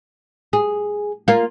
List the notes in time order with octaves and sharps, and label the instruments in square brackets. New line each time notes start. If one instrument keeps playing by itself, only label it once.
[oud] G#4
A#3 F4